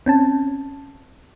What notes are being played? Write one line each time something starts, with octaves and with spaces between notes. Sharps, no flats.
C4 C#4 A5